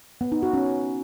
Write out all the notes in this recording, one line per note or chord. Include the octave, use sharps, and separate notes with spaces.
B3
D#4
F#4
C#4